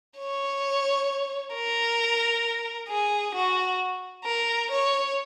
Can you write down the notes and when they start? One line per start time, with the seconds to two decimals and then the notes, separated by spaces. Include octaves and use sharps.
0.18 C#5
1.54 A#4
2.89 G#4
3.35 F#4
4.25 A#4
4.71 C#5